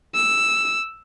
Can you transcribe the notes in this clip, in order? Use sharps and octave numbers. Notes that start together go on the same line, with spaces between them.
E6